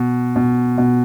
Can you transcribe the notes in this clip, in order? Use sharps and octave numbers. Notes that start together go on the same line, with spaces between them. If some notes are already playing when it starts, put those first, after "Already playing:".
Already playing: B2
B2
B2